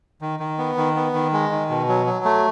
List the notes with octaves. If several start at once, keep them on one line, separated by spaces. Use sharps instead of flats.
D#3
D#3
B3
D#3
B3
D#3
G#3
D#3
B2
F#3
F#3
A3